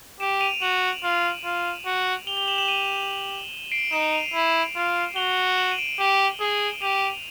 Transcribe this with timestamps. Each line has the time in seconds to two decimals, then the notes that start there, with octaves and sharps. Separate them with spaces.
0.20 G4 D7 E7
0.41 D#7 F7
0.61 F#4 E7 F#7
1.03 F4
1.44 F4
1.86 F#4
2.27 G4 F7 G7
2.37 F7 G7
2.48 E7 F#7
2.58 E7 F#7
2.68 D#7 F7
3.72 C7 D7
3.92 D#4 D7 E7
4.13 D#7 F7
4.34 E4
4.75 F4
5.16 F#4 F7 G7
5.58 E7 F#7
5.71 D#7
5.78 D7 E7
5.99 G4
6.40 G#4
6.82 G4 D#7 F7